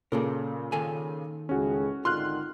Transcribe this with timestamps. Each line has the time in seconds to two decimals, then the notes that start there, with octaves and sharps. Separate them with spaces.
0.12 A#2 C#3 A#3 A4 A#4
0.72 D#3 A4 G#5
1.49 C#2 A2 C#4 F#4 G#4
2.05 G#1 D3 D#3 F4 C6 F6 F#6